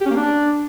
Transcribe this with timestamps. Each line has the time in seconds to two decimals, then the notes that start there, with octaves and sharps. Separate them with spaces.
0.01 G4
0.06 C#4
0.11 A#3
0.16 D4